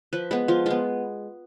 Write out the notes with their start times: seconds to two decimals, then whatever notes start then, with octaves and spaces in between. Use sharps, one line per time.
0.13 F3 B4
0.31 G#3 B3 B4
0.48 F3 F4
0.66 G#3 B3 F4